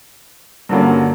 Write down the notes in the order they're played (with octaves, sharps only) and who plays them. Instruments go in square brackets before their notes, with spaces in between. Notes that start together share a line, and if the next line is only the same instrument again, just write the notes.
[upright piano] G2 D3 F#3 A#3 C#4